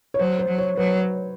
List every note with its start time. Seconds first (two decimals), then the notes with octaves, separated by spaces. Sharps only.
0.14 C#5
0.19 F#3 C5
0.39 C5
0.49 F#3
0.58 C#5
0.77 F#3 B4